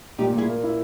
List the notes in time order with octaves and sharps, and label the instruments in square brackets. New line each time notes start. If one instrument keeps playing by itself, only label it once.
[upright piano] A#2 [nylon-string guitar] D#4 G4
[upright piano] A#2 [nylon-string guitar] E4 G#4
[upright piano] A#3
E4